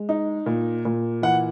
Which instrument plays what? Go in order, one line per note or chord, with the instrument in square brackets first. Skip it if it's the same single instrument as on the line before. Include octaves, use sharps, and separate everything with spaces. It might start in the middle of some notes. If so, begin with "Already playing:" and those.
Already playing: [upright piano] G#3
D#4
A#2
A#2
E3 F#5